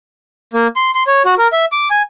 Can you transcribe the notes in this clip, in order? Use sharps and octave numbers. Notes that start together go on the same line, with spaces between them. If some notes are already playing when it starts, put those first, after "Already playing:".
A#3
C6
C6
C#5
F#4
A#4
E5
D6
G#5